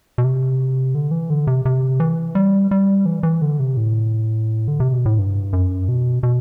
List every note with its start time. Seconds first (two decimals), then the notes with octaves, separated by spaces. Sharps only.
0.18 B2
0.24 C3
0.95 D3
1.11 E3
1.30 D3
1.47 C3
1.65 C3
2.00 E3
2.35 G3
2.71 G3
3.06 E3
3.23 E3
3.42 D3
3.60 C3
3.77 A2
4.68 D3
4.80 C3
4.93 B2
5.06 A2
5.18 G2
5.53 F#2
5.89 B2
6.23 B2